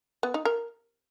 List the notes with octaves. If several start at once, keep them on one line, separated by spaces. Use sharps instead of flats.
B3
D#4
A#4